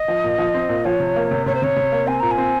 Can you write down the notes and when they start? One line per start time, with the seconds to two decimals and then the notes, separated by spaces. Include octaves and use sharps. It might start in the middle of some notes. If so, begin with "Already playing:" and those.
Already playing: D#5
0.08 F3
0.24 A#2
0.38 F3
0.54 C4
0.69 A#2
0.85 F3 C#5
1.00 C3
1.16 A#3
1.31 C3
1.46 C3 C#5
1.55 C5
1.62 C3 C#5
1.76 C3
1.92 A#3
2.07 C4 G#5
2.20 A#2 A#5
2.31 G#5
2.38 C4